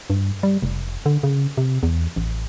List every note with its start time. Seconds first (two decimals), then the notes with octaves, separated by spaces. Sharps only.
0.10 G2
0.43 G3
0.63 F1
1.06 D3
1.23 C#3
1.57 C3
1.83 E2
2.16 A1